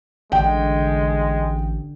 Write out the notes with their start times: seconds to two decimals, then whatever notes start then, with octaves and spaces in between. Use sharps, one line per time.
0.32 A1 D3 G#3 G5